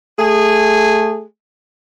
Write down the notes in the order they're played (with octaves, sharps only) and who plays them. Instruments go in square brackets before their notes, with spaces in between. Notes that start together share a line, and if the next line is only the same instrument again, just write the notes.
[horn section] A3 G#4